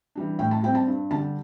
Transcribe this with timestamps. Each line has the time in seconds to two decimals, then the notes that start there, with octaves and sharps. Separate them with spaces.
0.15 E3 G3 D4
0.39 A2 G5
0.51 A5
0.63 G3 C4 G5
0.75 A5
0.87 G2
1.11 D3 G3 A5